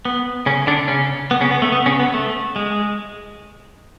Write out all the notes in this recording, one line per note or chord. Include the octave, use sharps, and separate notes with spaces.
B3
C#3 C#4
D3 D4
C#3 C#4
B3
C#3 C#4
B3
A3
B3
C#3 C#4
B3
A3
G#3